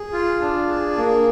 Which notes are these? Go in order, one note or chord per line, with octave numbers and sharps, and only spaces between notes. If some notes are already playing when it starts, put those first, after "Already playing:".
Already playing: G#4
F4
D4
G#4
A#3